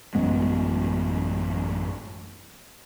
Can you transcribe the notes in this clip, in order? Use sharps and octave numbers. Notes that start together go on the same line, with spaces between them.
A1 F#2 G#3 B3